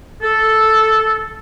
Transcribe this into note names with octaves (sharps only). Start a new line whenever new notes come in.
A4